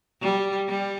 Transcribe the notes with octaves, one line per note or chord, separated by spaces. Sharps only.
G3
G3